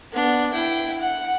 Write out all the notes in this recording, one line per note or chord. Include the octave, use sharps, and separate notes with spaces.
B3 D4
E4 G5
F#5